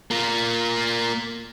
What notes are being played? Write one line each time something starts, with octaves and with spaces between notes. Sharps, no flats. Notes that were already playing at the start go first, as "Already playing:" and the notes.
A#3 F4